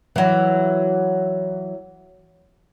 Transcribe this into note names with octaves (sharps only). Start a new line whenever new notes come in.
E3 F#3